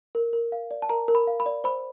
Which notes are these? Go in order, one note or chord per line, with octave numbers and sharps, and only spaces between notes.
A#4
A#4
F5
D5
A5
A#4 A#5
A#4
B5
F5
B5
D5
C5 B5